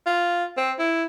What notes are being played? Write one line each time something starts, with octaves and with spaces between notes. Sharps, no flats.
F4
C4
E4